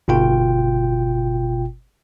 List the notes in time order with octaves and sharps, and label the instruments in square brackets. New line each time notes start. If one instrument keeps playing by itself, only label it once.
[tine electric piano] G1 B2 F4 G5